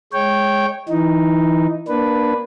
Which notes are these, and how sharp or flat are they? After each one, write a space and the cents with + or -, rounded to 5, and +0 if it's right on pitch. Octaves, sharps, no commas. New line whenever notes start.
G#3 +0 C#5 -15 G5 -10
E3 +0 D#4 +0
A#3 +15 D4 +5 B4 +0